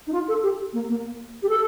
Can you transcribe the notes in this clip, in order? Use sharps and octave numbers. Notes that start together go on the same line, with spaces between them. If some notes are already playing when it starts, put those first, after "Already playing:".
D#4
F4
A4
G4
A#3
A#3
G4
A4